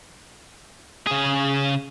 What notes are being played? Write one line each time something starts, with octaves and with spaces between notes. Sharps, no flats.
C#3 G#4